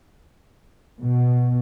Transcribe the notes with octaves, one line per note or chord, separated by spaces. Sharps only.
B2